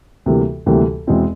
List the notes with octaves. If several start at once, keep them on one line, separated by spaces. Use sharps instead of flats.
D2 C3 E3 G3 A#3
D2 C3 E3 G3 A#3
E2 B2 G#3 C4 E4